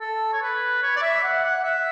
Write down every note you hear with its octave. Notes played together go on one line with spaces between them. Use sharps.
A4
C#5
B4
C#5
D5
E5
F#5
F#5
E5